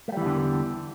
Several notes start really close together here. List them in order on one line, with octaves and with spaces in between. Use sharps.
A3 G3 E3 E2 D3